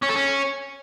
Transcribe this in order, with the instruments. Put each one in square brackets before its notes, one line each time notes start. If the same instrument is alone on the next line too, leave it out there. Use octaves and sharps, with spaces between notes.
[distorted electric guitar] C#4
A4
C#4